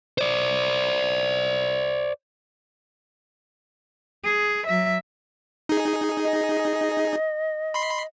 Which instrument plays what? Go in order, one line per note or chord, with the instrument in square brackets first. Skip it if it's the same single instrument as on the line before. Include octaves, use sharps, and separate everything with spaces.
[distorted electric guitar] C5 D5
[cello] G#4
F#3 E5
[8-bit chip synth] D#4 G#4
[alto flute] D#5
[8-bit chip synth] B5 C6 C7